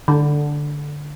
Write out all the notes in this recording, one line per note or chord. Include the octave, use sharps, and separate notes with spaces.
D3